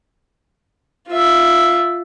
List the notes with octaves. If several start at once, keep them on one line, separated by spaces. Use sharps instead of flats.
F4 E5